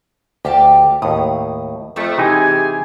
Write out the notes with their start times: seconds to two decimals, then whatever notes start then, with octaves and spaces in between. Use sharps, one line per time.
0.45 D2 G4 F5 A5
1.02 D#2 A2 D#6
1.96 F2 A3 C4 C#6
2.18 C3 E3 D#4 G4 G#4 G#5